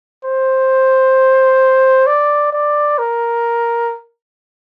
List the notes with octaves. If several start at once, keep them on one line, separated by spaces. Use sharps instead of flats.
C5
D5
D5
A#4